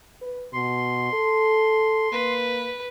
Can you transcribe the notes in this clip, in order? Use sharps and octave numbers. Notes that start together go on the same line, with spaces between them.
B4
B2 C6
A4
A#3 B4